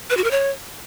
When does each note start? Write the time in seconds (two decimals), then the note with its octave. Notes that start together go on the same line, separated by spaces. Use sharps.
0.10 B4
0.17 F#4
0.24 A#4
0.31 C#5